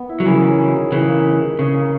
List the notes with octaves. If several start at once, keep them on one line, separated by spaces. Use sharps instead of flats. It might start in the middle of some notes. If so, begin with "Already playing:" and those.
Already playing: B3
E4
F#3
C#3 E3 A#4
F#3
D#4
G#4
C#3 E3 B4
A#3
D#4
G#4
C#3 B4
A#3